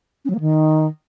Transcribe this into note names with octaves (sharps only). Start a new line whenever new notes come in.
C#4
F#3
A#3
D#3